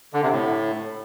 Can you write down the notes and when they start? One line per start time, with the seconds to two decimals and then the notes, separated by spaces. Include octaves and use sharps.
0.13 D3
0.23 C3
0.32 A2